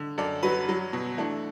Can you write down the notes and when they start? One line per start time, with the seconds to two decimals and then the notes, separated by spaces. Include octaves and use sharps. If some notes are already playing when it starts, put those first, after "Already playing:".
Already playing: D3
0.18 F#2 A4 D5
0.43 F#3 F#4 B4
0.69 F#3
0.93 B2
1.18 E3 A3 D4